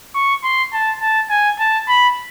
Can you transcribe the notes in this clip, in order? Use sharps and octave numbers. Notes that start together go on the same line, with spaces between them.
C#6
C6
A5
A5
G#5
A5
B5